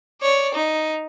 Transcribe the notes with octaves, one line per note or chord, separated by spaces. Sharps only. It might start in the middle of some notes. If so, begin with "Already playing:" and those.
C#5 D5
D#4